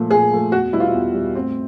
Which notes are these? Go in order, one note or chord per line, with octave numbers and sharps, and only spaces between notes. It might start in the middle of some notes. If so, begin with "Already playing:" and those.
Already playing: A#2 F3 A3
A#2 G#4
F3 A3
E2 F#4
B2 G3 E4
F4
E4
E2
B2 G3
A2 C4